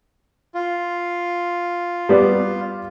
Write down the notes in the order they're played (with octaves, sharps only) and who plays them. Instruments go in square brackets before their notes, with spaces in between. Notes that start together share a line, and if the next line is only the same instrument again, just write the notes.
[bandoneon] F4
[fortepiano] G3 B3 D5